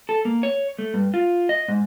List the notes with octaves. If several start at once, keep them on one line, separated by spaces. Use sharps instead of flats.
A4
A#3
C#5
A3
G2
F4
D#5
G#2